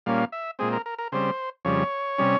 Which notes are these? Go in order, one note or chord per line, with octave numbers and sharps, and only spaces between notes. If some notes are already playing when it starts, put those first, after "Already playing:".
A#2 G3 A#3 C#4 F5
E5
A#2 G#3 C4 G#4
A#4
A#4
A#4
C#3 G3 C4 C5
F2 C#3 G3 C#5
C3 G3 C#4